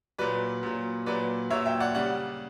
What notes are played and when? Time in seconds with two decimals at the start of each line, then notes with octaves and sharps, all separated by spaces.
0.18 A#2 F#3 B4 D5
0.63 A#2 F#3
1.06 A#2 F#3 B4 D5
1.50 A#2 F#3 C#5 E5
1.66 E5 G5
1.80 D5 F#5
1.94 C#3 G3 D5 F#5